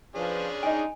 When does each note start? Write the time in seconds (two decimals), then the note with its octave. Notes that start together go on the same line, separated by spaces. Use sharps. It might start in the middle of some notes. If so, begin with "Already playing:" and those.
0.15 F3 C#4 D4 G#4 B4
0.63 G#3 D#4 D#5 G#5